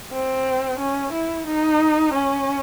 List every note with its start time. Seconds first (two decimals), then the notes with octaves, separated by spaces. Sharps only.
0.12 C4
0.79 C#4
1.13 E4
1.46 D#4
2.13 C#4